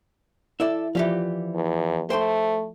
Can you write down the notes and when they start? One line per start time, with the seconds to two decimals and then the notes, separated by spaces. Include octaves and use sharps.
0.60 E4 A4 D5 E5
0.95 E3 F3 F4 G4 D5 F5
1.55 E2
2.10 A3 C5 G5 C6